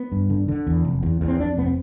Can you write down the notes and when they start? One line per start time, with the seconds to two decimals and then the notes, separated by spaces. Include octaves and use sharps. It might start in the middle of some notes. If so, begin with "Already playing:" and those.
Already playing: B3
0.12 G2
0.30 D3
0.48 D3
0.67 E2
0.85 F1
1.03 E2
1.21 E2
1.28 C4
1.40 F2 D4
1.57 F1 B3
1.64 C4